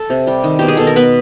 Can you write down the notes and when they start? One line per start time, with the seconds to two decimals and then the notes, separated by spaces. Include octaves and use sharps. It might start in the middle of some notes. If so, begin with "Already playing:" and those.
Already playing: A4
0.10 C3
0.27 G3
0.44 D#3
0.59 B2 G4
0.68 G#4
0.77 B2 A4
0.87 A#4
0.96 B3 B4